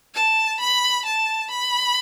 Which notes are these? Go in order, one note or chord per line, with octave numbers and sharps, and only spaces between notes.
A5
B5
A5
B5